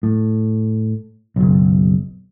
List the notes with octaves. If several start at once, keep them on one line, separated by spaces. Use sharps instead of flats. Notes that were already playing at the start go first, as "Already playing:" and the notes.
A2
F#1 B1